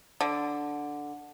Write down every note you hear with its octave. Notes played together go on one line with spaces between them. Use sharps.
D3